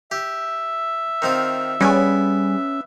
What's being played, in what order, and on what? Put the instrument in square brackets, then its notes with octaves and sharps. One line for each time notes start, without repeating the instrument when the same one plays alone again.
[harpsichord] G4 [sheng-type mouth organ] E5
[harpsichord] D#3 C4 F4
[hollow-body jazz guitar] G3 G#4 [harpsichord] B3 D5 [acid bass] C#4